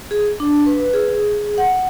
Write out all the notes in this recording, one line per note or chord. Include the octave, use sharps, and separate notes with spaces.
G#4
D4
B4
G#4
F#5